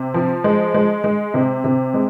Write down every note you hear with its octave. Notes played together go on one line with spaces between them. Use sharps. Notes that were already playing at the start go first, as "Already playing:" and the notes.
Already playing: C3
F3
G#3
G#3
G#3
C3
C3
G#3